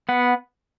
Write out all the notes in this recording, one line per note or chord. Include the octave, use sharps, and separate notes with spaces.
B3 F#5